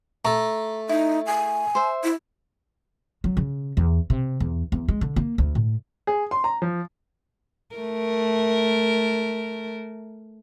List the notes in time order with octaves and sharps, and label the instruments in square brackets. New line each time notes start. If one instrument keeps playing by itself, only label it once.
[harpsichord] A3 A4 [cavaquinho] A#5
[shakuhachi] D#4 [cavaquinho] E4
[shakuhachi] G#5
[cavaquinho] C5 E5
[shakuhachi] E4
[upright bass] F#3
C#3
E2
C3
E2
E2
G#3
D3
A#3
D2
A2
[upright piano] G#4
C6
A#5
F3
[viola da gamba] A3 A#4